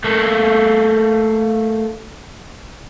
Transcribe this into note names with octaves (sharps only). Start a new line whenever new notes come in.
A3 A#3